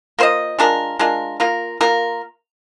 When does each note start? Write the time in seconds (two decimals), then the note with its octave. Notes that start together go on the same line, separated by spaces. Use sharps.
0.19 A#3 F4 C5 D#5
0.59 G#3 D4 F4 A#4
0.99 G#3 D4 F4 A#4
1.40 A#3 F4 A#4
1.81 A#3 F4 A#4